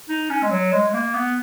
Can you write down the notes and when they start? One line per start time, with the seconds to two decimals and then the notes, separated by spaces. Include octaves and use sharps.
0.09 D#4
0.30 C#4
0.43 G#3
0.51 F#3
0.72 G#3
0.88 G#3
0.93 A#3
1.14 B3